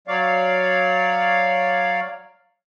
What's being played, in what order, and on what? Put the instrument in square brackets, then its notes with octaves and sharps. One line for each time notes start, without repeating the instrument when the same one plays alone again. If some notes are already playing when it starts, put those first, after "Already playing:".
[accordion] F#3 C#5 D5 F5